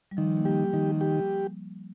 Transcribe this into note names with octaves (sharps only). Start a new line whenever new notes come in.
G3
D#3 F3
A#3
G3 G4
D#3 G3
G4